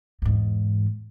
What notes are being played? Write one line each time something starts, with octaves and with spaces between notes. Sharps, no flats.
E2 G#2